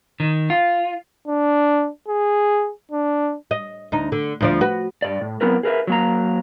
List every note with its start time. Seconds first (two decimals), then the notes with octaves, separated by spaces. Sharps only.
0.20 D#3
0.50 F4
1.28 D4
2.08 G#4
2.91 D4
3.51 D#5
3.92 D2 D#4
4.12 D3
4.41 D2 F3 D5
4.61 F#4 B4
5.02 G2 D5
5.21 A2
5.41 F#3 B3 C4 E4 A#4 B4
5.63 G#4 A#4 B4 E5
5.87 F#3 A#3 A#5